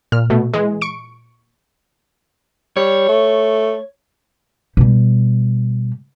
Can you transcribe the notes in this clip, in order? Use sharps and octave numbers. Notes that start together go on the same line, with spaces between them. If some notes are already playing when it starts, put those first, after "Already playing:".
A#2 F6
B2 A3
E3 G#3
C#6 C#7 D7
G3 C#5
A3
B2 G3